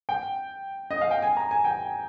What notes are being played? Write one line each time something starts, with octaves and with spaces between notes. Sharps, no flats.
G5
D#5
F5
G5
G#5
A#5
G#5
G5